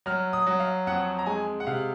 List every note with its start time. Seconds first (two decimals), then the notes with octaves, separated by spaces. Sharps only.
0.06 F#3 F6
0.33 D#6
0.47 F#3
0.60 F5
0.87 F2 F#5
1.19 A#5
1.26 G#3 G#5
1.60 F#5
1.67 C3 F5